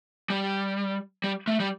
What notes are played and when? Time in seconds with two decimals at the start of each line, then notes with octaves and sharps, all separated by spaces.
0.30 G3
1.24 G3
1.47 A3
1.60 G3